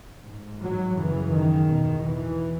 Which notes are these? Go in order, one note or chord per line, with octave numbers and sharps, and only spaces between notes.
G#2
F#3
F#2 C#3 E3
D#3
E2 B2
E3